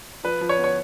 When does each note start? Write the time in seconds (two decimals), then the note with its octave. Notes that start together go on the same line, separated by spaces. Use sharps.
0.24 F3 B4
0.41 F3
0.49 C#5
0.58 B3
0.64 C#5